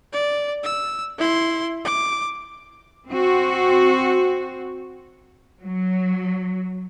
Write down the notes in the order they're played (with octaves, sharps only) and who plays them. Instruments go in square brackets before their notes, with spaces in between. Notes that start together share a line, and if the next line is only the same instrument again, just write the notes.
[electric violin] D5
E6
E4 C6
D6
[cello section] C4 F#4
[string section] F#3